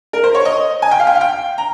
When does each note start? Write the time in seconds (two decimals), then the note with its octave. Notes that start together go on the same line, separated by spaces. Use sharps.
0.13 A#4
0.24 C5
0.35 C#5
0.45 D#5
0.82 G#5
0.91 G5
1.00 F5
1.07 G5
1.15 F5
1.21 G5
1.58 A#5